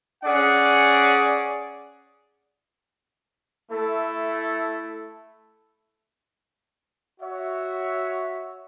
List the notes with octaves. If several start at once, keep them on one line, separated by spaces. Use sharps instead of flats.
C#4 G#4 D5 F#5
A3 E4 A4
F#4 C#5 E5